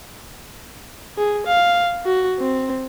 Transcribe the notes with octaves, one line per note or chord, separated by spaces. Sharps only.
G#4
F5
F#4
C4